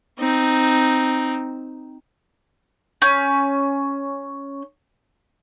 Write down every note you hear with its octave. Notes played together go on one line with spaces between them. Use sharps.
C4 D#4
C#4 G6